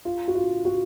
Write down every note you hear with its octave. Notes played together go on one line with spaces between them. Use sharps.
F4
F#4
F4
F#4